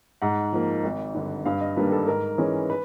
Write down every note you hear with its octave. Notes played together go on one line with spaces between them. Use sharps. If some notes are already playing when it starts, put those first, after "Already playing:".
G#2 F#5
F3 A#3
G#1
G2 D3
G2 F5
D#5
D#3 G3 A#3 D4 B4
A4
G#2 A#4
E3 G#3 C#4
B4